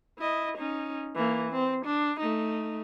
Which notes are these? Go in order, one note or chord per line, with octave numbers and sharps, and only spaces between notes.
E4 D#5
C#4 D#4
E3 A#3
C4
D4
A3 D#4